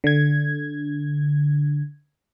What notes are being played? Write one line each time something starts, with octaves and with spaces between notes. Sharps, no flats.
D3 G#6